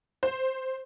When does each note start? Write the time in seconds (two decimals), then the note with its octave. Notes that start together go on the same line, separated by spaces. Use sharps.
0.23 C5